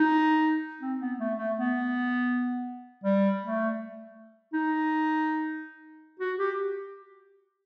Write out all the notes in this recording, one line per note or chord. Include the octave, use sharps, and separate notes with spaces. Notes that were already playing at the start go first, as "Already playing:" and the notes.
Already playing: D#4
C4
B3
A3
A3
B3
G3
A3
D#4
F#4
G4